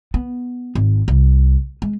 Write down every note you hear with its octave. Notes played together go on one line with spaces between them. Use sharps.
B3
G#1
C2
G#3